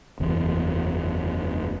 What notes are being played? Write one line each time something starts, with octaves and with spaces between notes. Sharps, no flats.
F#1 E2